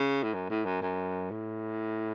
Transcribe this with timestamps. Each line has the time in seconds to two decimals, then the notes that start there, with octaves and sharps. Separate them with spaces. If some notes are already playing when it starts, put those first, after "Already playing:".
Already playing: C#3
0.23 A2
0.34 F#2
0.50 A2
0.65 F#2
0.82 F#2
1.31 A2